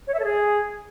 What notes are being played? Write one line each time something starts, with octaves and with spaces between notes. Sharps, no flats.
C#5
E5
A4
G#4